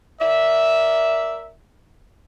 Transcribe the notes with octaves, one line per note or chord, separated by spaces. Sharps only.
A#4 D5 E5